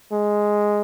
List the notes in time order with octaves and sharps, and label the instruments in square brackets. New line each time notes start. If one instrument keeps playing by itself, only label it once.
[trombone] G#3